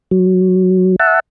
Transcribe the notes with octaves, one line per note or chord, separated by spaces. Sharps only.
F#3
E5 F#5 A5